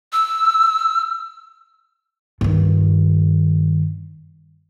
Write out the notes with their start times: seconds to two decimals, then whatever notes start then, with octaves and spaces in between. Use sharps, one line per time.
0.13 E6
2.41 G2 D#3